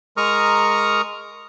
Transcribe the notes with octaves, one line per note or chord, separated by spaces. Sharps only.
G#3 A#4 A#5 C#6 D#6 F6